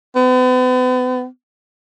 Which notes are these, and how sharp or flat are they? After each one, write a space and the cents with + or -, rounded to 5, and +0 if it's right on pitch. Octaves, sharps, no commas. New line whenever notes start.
B3 +40